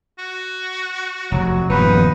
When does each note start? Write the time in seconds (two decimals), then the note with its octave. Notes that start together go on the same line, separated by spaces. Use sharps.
0.19 F#4
1.32 F1 F#3
1.70 D#1 G2 F3 B3 D#4 B4